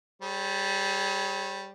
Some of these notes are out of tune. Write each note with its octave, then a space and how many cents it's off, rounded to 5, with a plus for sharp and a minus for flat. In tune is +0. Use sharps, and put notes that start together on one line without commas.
G3 +0 G#4 +35 C#5 -35